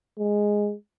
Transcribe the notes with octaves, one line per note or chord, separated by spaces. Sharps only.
G#3